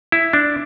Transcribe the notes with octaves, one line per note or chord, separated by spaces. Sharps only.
E4
D4